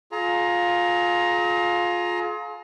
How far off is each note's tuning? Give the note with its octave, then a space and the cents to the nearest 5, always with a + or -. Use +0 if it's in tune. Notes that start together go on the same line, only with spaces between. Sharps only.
F4 +15 G#4 +40 A#5 +10